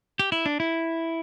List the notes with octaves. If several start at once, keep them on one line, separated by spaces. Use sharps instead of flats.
G4
E4
D4
E4